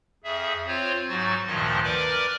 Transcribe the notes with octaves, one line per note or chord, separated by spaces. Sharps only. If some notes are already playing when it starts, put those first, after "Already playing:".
F2 G#4 E5
C4 F4 C5 C#5
G#2 F#3 F#4 A6
D2 G2 A#2 D#3 F3 D#5
A#4 B4 D5 D6 F6